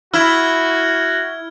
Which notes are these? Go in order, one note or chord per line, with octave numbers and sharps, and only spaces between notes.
E4 F#4 F6 G#6